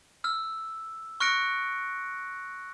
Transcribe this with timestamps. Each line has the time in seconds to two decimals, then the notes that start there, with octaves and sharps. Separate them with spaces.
0.24 E6 F6
1.20 C#6 F6 F#6 A#6 C#7 D7